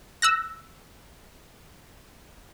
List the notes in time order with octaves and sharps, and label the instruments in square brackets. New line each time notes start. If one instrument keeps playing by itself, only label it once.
[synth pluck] E6 F#6 A#6